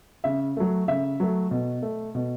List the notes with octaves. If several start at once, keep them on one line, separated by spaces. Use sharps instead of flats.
C#3 E5
F#3 A3
C#3 E5
F#3 A3
B2
A3
B2